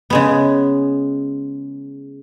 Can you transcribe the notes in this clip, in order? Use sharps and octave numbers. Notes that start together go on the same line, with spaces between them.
C#3 G#3 B3